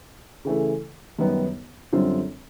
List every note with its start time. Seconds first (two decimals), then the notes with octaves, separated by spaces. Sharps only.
0.45 C#3 E3 A3
1.19 F#2 D#3 G3 B3 D#4
1.93 F#2 D3 G3 C4 F4